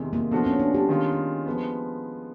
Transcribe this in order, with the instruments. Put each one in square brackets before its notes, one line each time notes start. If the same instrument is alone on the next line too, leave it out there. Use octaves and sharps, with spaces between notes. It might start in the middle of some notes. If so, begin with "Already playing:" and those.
Already playing: [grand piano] E2 C3 D#3 G#3
[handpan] A#3
[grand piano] F3 A3 D4 F#4 A4 [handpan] B3
[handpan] C#4
D4
G4
[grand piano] D#3 G#3 C#4 F4
F3 G#3 B3